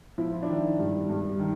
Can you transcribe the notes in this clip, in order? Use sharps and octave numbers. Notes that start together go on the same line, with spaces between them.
F3 E4
F4
D4 E4
D#3
G2
G2
D#3